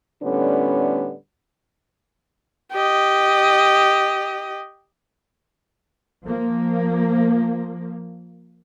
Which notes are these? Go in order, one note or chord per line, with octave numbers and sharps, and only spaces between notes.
A2 D3 G3 B3 C#4
G4 D#5
F3 A#3